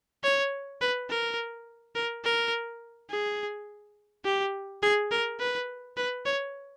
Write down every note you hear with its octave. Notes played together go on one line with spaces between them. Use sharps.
C#5
B4
A#4
A#4
A#4
G#4
G4
G#4
A#4
B4
B4
C#5